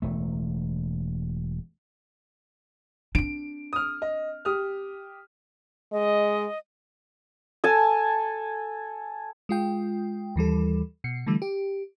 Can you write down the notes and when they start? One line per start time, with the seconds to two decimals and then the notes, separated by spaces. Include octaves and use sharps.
0.02 E1 A3
3.15 C4 D4 D7
3.73 D#6 F6
4.02 D#5
4.45 G4 D#6 F6
5.92 G#3 D#5
7.64 A4 G#5 A5
9.49 G#3 F4 G5
10.36 D#2 E3 G3 A4
11.04 B2 C7 C#7
11.27 D3 E3 G3 A3
11.42 G4